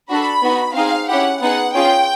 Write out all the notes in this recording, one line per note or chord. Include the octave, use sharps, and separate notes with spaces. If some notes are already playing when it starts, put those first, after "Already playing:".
D4 F#4 A4 B5
B3 D#4 F#4
C4 D#4 G#4 F5
C#4 E4 G4 F#5
B3 D#4 G#4 F#5
C#4 F4 G#4 G5